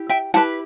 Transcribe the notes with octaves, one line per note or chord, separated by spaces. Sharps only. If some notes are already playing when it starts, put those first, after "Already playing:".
Already playing: E4 G4
E5 G5
E4 G4 B4 F#5 A5